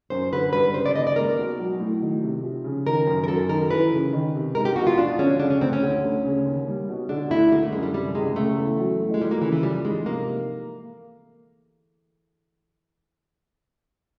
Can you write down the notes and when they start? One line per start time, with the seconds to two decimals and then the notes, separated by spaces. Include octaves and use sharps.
0.10 F#2 C5
0.33 D3 B4
0.53 G2 B4
0.74 C#3 C5
0.86 D5
0.95 D#2 D#5
1.07 D5
1.16 G#3 A#4
1.38 B2
1.59 F#3
1.80 A2
2.02 D#3
2.23 C3
2.43 F3
2.64 C#3
2.86 D#3 A#4
3.07 F#2
3.24 A#4
3.28 F#3 A4
3.49 D#3 A#4
3.70 E3 B4
3.92 C#3
4.13 D#3
4.35 C3
4.55 G#3 A#4
4.65 G4
4.76 B2 F#4
4.87 F4
4.98 F3 D4
5.18 D3 C#4
5.39 C#3 D4
5.50 C#4
5.61 D2 C4
5.73 C#4
5.82 D3
6.04 D2
6.25 C#3
6.45 D#2
6.68 G3
6.89 B2
7.09 D3 D4
7.30 D2 E4
7.52 D3 A#3
7.63 A3
7.72 F#2 G#3
7.83 G3
7.94 C3 G3
8.15 C#2 G#3
8.36 C#3 A3
8.58 E2
8.79 F#3
9.00 A2
9.14 G#3
9.20 F3 G3
9.31 A#3
9.41 C#3 E3
9.52 E3
9.63 F3 G3
9.85 G#2 G#3
10.05 C3 A#3